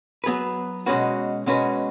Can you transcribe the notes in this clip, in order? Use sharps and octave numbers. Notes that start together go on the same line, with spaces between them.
F#3 B3 G#4 B4
B2 G#3 C#4 F#4 B4
B2 G#3 C#4 F#4 B4